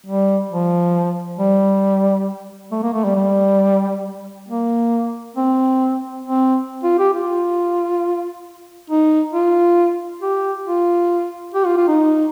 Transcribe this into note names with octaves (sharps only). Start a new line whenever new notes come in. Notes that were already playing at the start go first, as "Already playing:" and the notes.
G3
F3
G3
A3
A#3
A3
G3
G3
A#3
C4
C4
F4
G4
F4
D#4
F4
G4
F4
G4
F4
F4
D#4